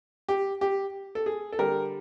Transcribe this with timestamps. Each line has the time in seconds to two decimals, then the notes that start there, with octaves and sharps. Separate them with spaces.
0.29 G4
0.61 G4
1.15 A4
1.26 G#4
1.52 A4
1.59 D3 G3 A#4